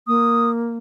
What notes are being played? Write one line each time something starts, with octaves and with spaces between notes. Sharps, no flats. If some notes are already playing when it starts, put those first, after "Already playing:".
A#3 D#6